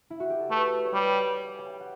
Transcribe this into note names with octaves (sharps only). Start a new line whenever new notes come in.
E4
F#4
G4
A4
A3 B4
C#5
G3 B4
C#5
G5
G5
G5
F#5